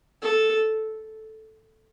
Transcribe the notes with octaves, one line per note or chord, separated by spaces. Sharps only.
A4